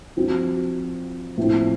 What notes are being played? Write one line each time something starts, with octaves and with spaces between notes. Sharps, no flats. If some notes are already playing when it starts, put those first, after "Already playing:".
F3 C4 F#4
A2 F3 C4 F4